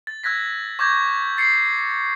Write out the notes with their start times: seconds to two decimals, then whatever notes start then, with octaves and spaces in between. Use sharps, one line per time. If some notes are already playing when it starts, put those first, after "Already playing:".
0.07 A6
0.23 E6 F#6 G#6 A#6 B6
0.79 C#6 D6 G6 G#6 A#6
1.37 A6 C7 C#7